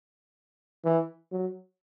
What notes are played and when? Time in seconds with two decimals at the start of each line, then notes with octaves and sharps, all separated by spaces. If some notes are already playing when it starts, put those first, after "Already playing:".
0.85 E3
1.32 F#3